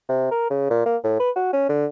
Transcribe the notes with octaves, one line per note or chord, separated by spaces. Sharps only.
C3
A#4
C#3
A#2
A#3
A2
B4
F#4
C#4
D3